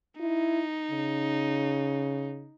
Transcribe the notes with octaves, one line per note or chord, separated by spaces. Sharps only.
D#4 E4
C#3